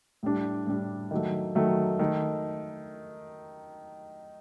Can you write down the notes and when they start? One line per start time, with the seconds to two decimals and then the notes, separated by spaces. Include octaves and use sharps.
0.23 A2 G3 D4
0.67 A2 G3 D4
1.11 D#3 F#3 A3
1.55 D#3 F#3 A3
1.99 D#3 A3